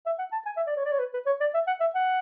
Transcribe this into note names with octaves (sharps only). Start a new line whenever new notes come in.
E5
F#5
A5
G#5
E5
D5
C#5
D5
C#5
B4
B4
C#5
D5
E5
F#5
E5
F#5